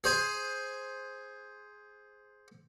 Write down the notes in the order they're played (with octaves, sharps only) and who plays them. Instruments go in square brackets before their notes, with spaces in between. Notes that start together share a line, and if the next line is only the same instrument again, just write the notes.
[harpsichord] G#4 C5 G#5